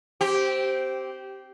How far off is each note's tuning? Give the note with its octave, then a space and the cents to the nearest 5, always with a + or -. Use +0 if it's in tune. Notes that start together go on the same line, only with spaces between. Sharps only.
C4 +0 G4 -15